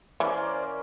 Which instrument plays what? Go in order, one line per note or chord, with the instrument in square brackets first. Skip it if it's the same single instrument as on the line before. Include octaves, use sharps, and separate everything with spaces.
[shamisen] E3 [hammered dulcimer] A#3 C#4 C6 [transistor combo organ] C5 D5